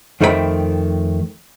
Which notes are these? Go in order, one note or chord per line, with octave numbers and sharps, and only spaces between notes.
F2 D#3 A3 C4 G#4 B5